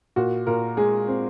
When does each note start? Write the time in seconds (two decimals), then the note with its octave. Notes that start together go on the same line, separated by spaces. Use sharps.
0.16 A#2 F#4
0.47 A#2 A#4
0.77 G#3 G#4
1.08 C4